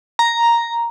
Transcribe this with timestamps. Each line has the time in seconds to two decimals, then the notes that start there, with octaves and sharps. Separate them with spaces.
0.19 A#5